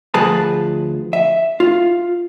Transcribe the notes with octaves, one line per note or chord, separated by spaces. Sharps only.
D2 F3 G#4 B4 A5 B5
E5
F4